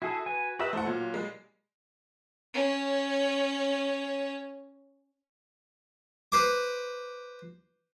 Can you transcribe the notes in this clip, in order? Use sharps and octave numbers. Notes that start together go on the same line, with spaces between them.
E4 F#4 G#4 A4
B4 G#5
F#4 G4 B4 E5 D#6
A3 E4 C5 F#5
A#2 F#3 F4
G3 G#3
C#4 C#5
B4 C5 D6